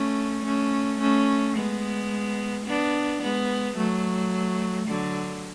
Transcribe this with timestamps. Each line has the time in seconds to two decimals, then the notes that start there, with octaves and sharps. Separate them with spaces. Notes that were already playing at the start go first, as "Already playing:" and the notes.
Already playing: A3 C#4
0.44 A3 C#4
1.00 A3 C#4
1.56 G#3 B3
2.66 B3 D4
3.22 G#3 B3
3.77 F#3 A3
4.88 D3 F#3